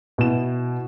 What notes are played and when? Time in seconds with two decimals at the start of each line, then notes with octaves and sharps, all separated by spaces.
0.18 B2 E4 E7